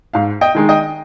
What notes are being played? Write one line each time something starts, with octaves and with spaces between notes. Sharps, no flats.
G#2 F5
D#5 G5
D#3 G#3 D#4
D#5 G5